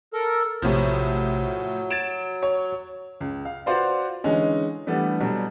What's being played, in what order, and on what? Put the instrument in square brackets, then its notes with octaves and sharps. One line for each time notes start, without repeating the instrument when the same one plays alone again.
[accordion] A4 A#4
[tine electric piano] A#1 C3 G4 [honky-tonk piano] A2 F3 [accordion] F#3
[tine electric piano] F#4 G#6 A6 [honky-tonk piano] D7 E7
[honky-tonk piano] C#5
[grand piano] C#2
F5
F4 F#4 B4 C5 D5 F5
D3 E3 G#3 C#4 D#4
E3 G3 A3 B3 D4
B2 F#3 G3